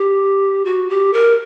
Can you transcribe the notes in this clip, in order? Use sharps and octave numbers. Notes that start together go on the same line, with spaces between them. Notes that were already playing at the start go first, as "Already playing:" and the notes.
Already playing: G4
F#4
G4
A#4